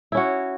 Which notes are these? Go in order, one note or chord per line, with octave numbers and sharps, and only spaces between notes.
C#4 E4 F#4